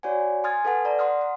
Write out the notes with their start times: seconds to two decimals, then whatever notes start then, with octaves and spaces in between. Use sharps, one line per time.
0.03 F#4 C#5 D5 F#5 G#5
0.44 G#5 C6 D#6 F6 G#6 A6
0.65 A4 B4 F#5 A5
0.85 D5 A#5
0.99 F#5 C6 D#6 F6
1.21 F#5